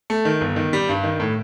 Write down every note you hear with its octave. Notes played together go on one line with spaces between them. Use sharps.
A3
D#3
G1
D#3
G3
G2
D#3
A2